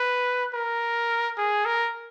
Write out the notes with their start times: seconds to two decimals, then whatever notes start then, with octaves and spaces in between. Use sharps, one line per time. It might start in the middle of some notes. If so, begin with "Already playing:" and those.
Already playing: B4
0.54 A#4
1.37 G#4
1.65 A#4